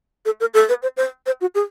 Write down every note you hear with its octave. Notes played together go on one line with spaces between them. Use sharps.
A4
A#4
A4
B4
C5
C5
C5
F#4
G#4